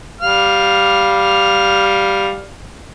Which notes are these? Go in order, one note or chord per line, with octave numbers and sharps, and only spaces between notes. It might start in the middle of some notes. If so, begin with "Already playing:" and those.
G3 F5 F6